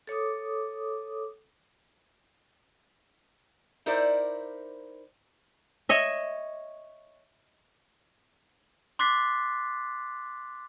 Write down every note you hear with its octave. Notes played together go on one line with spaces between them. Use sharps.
A4 C#5 D6 D#6
D#4 E4 A#4 C5 D5
C#5 D#5 E5
C6 D6 F#6 A6 B6 C7